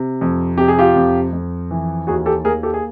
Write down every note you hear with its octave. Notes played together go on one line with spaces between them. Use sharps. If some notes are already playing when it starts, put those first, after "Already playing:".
Already playing: C3
F2
C3 G4
G#4
F4 G4
F2
F2
E3
D#2 F#4 G#4
G4 A4
A#3 G#4 A#4
G4 A4
G#4